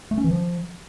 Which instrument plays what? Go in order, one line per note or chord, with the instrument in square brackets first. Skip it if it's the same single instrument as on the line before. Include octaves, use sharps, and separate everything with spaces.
[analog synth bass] A3
C#4
E3
F3